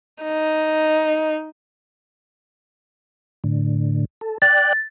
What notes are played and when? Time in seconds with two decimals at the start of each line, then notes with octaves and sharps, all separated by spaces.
0.23 D#4
3.44 A2 D3
4.21 A4
4.42 D5 G5 F#6 A6